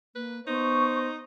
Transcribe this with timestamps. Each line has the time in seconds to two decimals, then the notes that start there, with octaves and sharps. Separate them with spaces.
0.16 A#3 B4
0.47 B3 D#4 C5 C#6